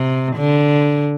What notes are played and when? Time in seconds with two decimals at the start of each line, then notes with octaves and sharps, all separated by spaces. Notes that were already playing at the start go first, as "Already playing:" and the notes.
Already playing: C3
0.36 D3